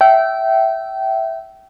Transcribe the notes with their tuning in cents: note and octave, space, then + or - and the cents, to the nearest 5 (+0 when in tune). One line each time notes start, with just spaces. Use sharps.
E5 +0 G5 -25